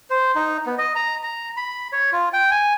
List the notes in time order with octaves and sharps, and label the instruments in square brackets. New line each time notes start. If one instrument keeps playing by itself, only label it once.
[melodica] C5
D#4
B3
D#5
A#5
A#5
B5
C#5
F4
G5
G#5